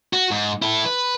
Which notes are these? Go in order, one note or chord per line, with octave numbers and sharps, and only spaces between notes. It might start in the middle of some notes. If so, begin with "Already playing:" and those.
F#4
G#2
E4 A4
B4